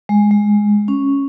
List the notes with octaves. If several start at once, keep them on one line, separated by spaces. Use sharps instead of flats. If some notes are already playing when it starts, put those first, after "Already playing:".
G#3
G#3
C#4